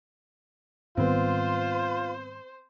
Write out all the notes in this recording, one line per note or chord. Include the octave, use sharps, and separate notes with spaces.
G#2 D#3 G3 B3 C4 F4 C5